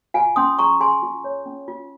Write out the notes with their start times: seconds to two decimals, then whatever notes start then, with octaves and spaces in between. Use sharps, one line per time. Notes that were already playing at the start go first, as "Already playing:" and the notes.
0.14 F4 F5 G#5
0.36 C#4 C6 D#6
0.59 G#4 A#5 C#6
0.80 G#4 G#5 C6
1.03 F4
1.24 C#5
1.46 C#4
1.68 F4